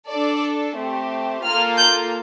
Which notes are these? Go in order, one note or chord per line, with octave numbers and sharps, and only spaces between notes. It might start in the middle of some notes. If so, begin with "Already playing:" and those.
D4 A4 D5
A3 C4 G4
A#3 F4 A4 F6
G6